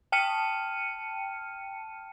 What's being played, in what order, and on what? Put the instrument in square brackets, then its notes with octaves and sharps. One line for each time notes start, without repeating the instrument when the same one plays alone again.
[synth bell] G5 A5 F6 C#7 D#7